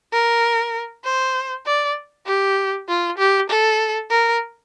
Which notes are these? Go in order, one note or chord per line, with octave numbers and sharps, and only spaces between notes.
A#4
C5
D5
G4
F4
G4
A4
A#4